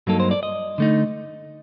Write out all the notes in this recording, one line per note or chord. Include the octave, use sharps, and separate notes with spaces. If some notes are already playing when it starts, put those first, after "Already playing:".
G2 F#3 A#3 D#4 A4
C5
D5
D#5
D3 A3 D#4